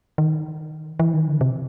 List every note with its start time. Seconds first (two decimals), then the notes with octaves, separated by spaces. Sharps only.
0.18 D#3
1.00 E3
1.14 D#3
1.28 D3
1.41 C3